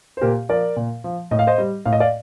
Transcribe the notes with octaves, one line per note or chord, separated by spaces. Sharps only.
C5
A#2 G4 A#4
F3 A#4 D5
A#2
F3
A2 D#5
F5
C5 D#5
G3
A2 F5
D#5
D5 F5